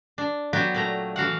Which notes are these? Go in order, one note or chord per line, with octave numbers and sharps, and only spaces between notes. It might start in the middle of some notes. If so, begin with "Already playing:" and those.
D4
F#3 B3 F#4 G4
A#2 A3 A#5
E3 F#4 F5 F#5